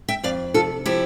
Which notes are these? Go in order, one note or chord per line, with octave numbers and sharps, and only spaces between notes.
E5 G5
F2 D5 F5
C3 F4 A4
F3 E4 G4